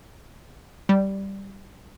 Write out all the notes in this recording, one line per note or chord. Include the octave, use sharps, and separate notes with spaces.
G3